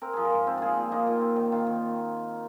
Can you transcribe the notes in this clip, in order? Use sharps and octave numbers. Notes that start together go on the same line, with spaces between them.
C4 A#4
F3 G#4
A#4
G#2
C4
A#2 F4 G#4
A#2
A#3 D#4
A#2
C4
D#3
D#3 F4
D#3